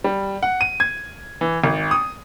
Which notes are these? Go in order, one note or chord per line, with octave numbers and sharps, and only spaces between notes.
G3
F#5
D#7
G#6
E3
G#1
D#6